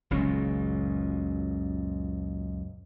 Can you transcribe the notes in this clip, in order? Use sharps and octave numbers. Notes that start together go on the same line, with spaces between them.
F#1 C#2 A#2 C#4